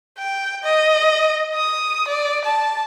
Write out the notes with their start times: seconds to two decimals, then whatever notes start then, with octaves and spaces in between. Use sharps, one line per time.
0.18 G5
0.64 D#5
1.55 D#6
2.08 D5
2.45 A5